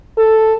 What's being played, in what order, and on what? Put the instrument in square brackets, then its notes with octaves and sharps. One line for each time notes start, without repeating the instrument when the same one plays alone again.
[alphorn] A4